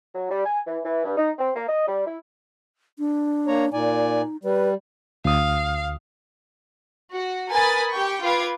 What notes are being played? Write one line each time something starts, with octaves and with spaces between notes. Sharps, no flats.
F#3
G3
G#5
E3
E3
G2
D#4
C4
A#3
D#5
G3
E4
D4
A#3 C#5 A#5
A#2 D#4 D5 G#5
G3 B4
D2 F5 D#6
F#4
A#4 B4 G#5 B5 D#6 A6
G4 G5 C#6
F4 B4 D6 G#6